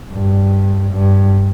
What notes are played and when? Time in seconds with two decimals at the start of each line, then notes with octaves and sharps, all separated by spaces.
0.12 G2
0.92 G2